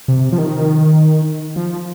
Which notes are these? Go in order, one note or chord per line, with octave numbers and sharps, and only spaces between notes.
C3
F3
D#3
F3